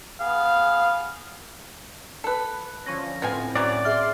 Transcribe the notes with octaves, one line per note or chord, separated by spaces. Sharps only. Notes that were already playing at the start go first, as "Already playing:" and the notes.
B3 G#4 F5
A4 B4
D3 F3 C#4 C#6 A#6
A2 B3 C4 F4 G#5
E3 F#3 C#4 D5
G#4 E5 C6 F6